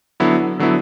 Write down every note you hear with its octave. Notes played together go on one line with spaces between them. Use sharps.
D3 F#3 B3 E4
D3 F#3 B3 E4